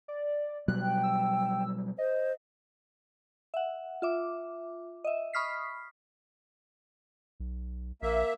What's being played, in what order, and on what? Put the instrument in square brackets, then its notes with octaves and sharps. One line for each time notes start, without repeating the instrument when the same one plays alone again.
[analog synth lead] D5
[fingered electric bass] B2 F#3 G3 [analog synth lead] F#6
[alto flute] G5
[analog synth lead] E6
[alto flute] C5 [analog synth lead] D#5
[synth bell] E5 F#5
F4 E5 D6
D#5 E5
B5 C#6 D#6 F6 B6 C7
[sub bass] B1
[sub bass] A#1 [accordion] A#3 E5